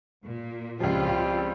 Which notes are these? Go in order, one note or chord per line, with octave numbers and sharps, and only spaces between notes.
A#2
C#2 F3 G3 C4 F4 G4